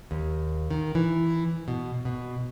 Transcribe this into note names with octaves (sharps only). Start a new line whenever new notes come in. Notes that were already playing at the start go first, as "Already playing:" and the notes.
D#2
D#3
E3
B2
B2